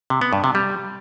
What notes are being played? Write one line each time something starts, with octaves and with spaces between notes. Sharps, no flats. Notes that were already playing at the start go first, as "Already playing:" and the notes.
C3
B3
G2
C3
G3